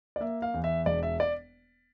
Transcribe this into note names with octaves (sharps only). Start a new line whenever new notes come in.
D5
A#3 E5
F5
E2
E5
E1 D5
E5
D5